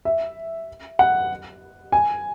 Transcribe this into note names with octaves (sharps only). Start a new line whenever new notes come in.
E5
F#5
G#5